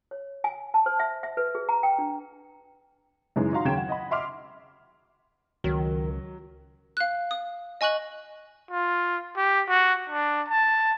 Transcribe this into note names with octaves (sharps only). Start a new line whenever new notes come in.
C#5
G#5
A5
C5
E5
E5
B4
G#4
A#5
G5
D4
F#2 C#3 E3 G#3 D#4
D#4 F#4 F5 A#5 C6
D#2 C#3 F#3 G5 G#6 E7
F#5
D#5 F#5 B5
D#5 E5 C6 D6 F6
C#2 D#3 F#3
F5 F#6
D#6
D#5 G#5 C#6 F#6 F#7
F4
G4
F#4
D4
A5